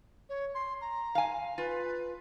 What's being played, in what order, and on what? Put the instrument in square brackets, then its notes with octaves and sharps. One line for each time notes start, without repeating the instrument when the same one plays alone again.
[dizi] C#5
C6
A#5
[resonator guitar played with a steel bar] F5 G#5
[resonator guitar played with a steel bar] F4 [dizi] B4